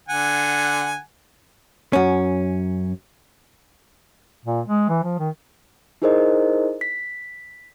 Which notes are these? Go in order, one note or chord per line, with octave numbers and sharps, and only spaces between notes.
D3 F#5 G#5
F#2 C#4
A#2
G#3
E3
F3
D#3
D#4 E4 G#4 A#4 C5 D#5
B6